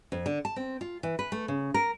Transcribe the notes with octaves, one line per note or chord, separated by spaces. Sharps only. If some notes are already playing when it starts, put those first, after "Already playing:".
F2
D3
A5
C4
F4
E3
B4
A3
C#3
A#4